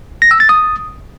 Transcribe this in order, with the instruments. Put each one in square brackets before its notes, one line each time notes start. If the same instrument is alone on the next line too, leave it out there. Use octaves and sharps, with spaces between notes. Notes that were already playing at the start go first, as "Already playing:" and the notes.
[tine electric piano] A#6
E6
A6
D#6